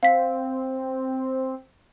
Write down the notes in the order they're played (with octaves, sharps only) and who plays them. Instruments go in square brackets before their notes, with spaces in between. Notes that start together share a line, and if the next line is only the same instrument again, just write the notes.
[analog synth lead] C4 [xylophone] F5 B6